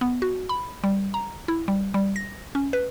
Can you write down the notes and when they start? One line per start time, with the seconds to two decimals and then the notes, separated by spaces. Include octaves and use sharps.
0.01 B3
0.22 F#4
0.49 B5
0.84 G3
1.14 A#5
1.48 E4
1.68 G3
1.94 G3
2.16 A#6
2.55 C#4
2.73 B4